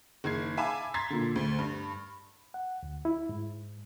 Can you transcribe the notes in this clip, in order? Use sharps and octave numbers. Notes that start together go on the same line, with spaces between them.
F#1 D#3 G#6 C7
E5 F5 G#5 A5 B5 D6
A#5 C6 G#6 A6 B6 C7
A#2 D3
D2
G2
F#5
D2
E4
G#2